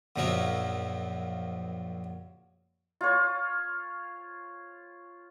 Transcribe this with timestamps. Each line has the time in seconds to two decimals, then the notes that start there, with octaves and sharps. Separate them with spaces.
0.16 A#1 F#2 F3 F#3 C#4 A#4
3.01 F4 C#5